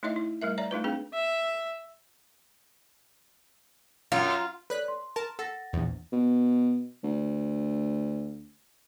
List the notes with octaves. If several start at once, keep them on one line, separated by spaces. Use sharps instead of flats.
A3 D#4 E4 C#5 D#5 E5
E4
G3 A3 A#4 E5
C#5 D5 E5 A#5
A3 D#4 F4 B4
C4 D4 G#4 B4 F5
E5
F#2 F4
A4 B4 C#5 D5 F#6 B6
C6
A#4 A5
A4 F#5 A6 A#6
A#1 E2
B2
D2